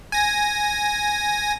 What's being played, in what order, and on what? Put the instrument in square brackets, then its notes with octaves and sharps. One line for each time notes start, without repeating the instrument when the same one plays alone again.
[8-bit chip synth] G#5 A#6